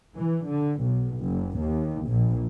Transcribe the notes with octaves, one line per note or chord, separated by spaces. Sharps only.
E3
D3
B1
F#1
D#2
A#1